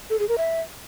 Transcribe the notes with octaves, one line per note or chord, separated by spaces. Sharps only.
A4
G#4
A#4
E5